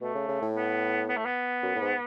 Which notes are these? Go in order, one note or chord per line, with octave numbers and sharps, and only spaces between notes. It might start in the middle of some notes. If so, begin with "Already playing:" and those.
B2 A3
C#3
C#3
A2
B3
B3
A3
B3
F#2
A2
G#2